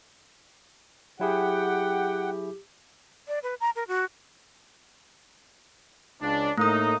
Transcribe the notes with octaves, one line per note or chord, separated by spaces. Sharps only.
F#3 E4 G4 G#4 F#5 G5
D5
B4
A#5
A#4
F#4
C#2 D4
A2 A3 A#3 D#4 D#6